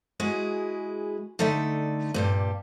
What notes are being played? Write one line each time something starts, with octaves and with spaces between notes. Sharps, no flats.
G#3 E4 F#4 G#4
D3 A3 D#4 D5 E5
G2 A#2 G3